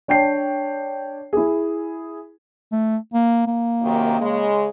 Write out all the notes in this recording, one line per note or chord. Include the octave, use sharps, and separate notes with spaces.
D4 C#5 G5 A5 C7
E4 G#4
A3
A#3
A#3
F#2 C3 D#3
C#3 G#3